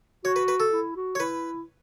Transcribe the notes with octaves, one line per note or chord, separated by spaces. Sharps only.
F#4 C#5
B4
B4
A4
E4
F#4
C#5
E4 B4